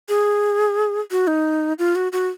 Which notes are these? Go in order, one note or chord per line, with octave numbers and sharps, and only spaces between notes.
G#4
F#4
D#4
F4
F#4
F#4